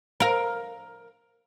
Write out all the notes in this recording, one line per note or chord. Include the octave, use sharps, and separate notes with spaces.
A#4 F5